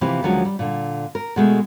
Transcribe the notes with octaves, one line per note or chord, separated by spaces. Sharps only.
C3 E3 F3 A#3 C4 G4
D#2 D3 F3 F#3 G#3 C#4
G3
A#2 D3
A#4
B2 G#3 A3